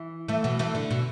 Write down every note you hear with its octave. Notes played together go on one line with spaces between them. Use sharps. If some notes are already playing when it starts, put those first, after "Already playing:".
Already playing: E3
E3 A3
B2 E3
E3 A3
D3
B2